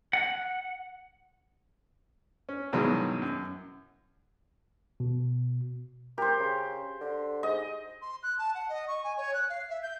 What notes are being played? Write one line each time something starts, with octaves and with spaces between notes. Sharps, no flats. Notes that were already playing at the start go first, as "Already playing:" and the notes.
F#5
C#4
G2 B2 D#3 E3 F#3 G#3
F#2
B2
G4 A#4 C5
C#3
D3
G#2 D#5
C6
F#6
A5
F#5
D#5
C#6
G#5
C#5
F#6
F5
E5
G6